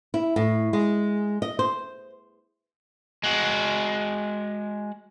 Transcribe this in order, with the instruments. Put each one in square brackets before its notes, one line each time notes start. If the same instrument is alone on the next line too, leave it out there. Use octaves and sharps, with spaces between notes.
[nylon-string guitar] E4
A2
G#3
D#5
C5
[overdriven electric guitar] G#3 F#4